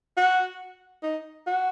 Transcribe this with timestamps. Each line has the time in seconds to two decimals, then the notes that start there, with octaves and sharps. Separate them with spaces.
0.17 F#4
1.03 D#4
1.46 F#4